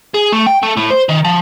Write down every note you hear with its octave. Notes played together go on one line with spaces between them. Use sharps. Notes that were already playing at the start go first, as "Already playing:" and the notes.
G#4
A3
G5
A3
A2
C5
D#3
F3